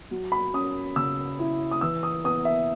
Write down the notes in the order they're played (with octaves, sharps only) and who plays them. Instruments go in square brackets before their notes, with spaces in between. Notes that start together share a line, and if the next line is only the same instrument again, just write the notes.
[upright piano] F#3
B5
C#4 D#6
C#3 E6
E4
D#6
E3 E6
D#6
B3 D#6
E5